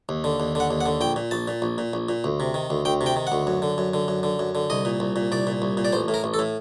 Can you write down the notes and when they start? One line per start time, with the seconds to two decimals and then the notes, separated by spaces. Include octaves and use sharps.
0.09 D#2
0.24 D3
0.40 D#2
0.55 D3 F#5
0.71 D#2
0.81 F#5
0.86 D3
1.01 A#1 G5
1.16 A#2
1.31 A#1 A5
1.48 A#2
1.62 A#1
1.78 A#2
1.93 A#1
2.09 A#2
2.24 D2
2.40 C3
2.54 D#3
2.70 D2
2.85 D2 G5
3.01 C3
3.06 G5
3.16 D#3
3.27 F#5
3.32 D2
3.47 F#2
3.62 D3
3.78 F#2
3.94 D3
4.08 F#2
4.23 D3
4.39 F#2
4.55 D3
4.70 C2 D#5
4.85 A#2
5.00 C2
5.16 A#2
5.32 C2 D5
5.47 A#2
5.62 C2
5.77 A#2
5.85 D5
5.93 A1 C5
6.08 A2
6.14 A#4
6.24 A1
6.34 A4
6.39 A2